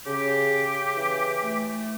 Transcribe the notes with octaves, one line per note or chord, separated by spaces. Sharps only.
C#3 G4
C#3
E3
A3